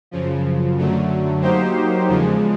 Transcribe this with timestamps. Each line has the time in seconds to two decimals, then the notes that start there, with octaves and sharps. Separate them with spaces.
0.11 F#2 C#3 F3
0.77 F#2 D3 F#3 A3
1.42 F#3 A#3 D#4 G4 C5
2.08 E2 C#3 F3 G#3